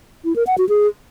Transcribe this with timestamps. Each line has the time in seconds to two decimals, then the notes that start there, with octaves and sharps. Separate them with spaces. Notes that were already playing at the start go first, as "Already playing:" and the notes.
0.25 E4
0.36 A#4
0.47 F#5
0.58 F#4
0.69 G#4